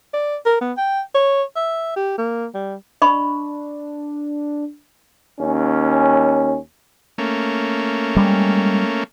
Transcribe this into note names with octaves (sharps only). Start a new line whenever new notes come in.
D5
A#4
B3
G5
C#5
E5
G4
A#3
G3
D4 D#5 B5 C#6
D#2 C#4
A3 A#3 C#4
G3 G#3